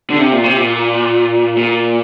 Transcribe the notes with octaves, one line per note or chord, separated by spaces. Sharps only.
D3
C3
A#2
C3
A#2
A#2